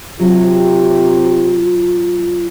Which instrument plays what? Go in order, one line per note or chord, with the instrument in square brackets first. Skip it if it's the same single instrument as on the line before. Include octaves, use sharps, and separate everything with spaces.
[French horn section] C3 G4 [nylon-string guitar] F#3 [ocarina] F4